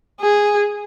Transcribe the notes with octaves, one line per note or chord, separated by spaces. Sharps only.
G#4